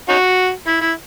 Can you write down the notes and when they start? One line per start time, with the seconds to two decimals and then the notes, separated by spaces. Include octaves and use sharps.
0.09 C#4 D#4 F#4
0.68 E4
0.81 E4